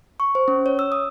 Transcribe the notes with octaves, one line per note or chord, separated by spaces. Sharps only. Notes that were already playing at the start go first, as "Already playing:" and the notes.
C#6
C5
C#4
C#5
E6
D#6